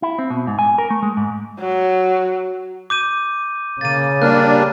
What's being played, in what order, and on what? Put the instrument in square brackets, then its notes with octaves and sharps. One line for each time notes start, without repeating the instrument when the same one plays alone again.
[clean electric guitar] E4
C4
B2
G#2
G#5
A#4
A3
G#3
G#2
[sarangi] F#3
[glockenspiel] D6 G6 D#7
[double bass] C#3 [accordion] A#3 [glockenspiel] A6 D#7
[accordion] G3 D4 [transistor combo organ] A#3 [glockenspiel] F6 F#6